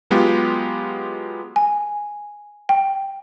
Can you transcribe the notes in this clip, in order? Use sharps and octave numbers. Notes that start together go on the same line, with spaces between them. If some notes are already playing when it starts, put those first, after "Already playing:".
F#3 G#3 B3 F4 G4
G#5
G5